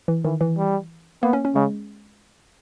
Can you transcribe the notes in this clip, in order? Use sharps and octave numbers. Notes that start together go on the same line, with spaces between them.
E3
D#3 E3
E3
G3
A#3 B3
C#4
C#4
C#3 G#3